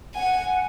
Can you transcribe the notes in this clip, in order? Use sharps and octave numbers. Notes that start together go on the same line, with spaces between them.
F#5 G#5